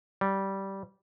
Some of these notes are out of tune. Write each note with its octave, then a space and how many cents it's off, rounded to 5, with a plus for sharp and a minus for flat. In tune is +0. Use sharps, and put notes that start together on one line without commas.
G3 -15